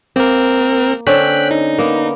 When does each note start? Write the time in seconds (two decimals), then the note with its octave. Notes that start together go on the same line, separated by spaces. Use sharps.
0.16 A#3 C4 A#4
1.07 D3 C4 C#4 G5 F#6 B6
1.51 D#4
1.78 A#3 B3